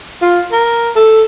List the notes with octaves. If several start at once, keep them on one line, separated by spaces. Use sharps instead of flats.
F4
A#4
A4